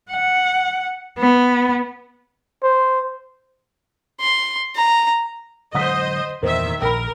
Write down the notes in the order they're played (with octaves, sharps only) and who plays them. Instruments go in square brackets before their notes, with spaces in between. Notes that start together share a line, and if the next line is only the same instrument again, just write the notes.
[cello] F#5
B3
[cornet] C5
[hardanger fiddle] C6
A#5
[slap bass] D3 F#3 G#3 [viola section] C5 D#5 [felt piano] F#5 D#6 B6
[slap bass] E2 G2 A#2 [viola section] D#3 E5 [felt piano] A#4 C5
[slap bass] A#1 [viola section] A#4 [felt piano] G5 B5